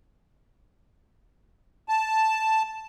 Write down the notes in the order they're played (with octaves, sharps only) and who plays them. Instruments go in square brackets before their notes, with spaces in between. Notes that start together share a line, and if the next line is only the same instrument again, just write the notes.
[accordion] A5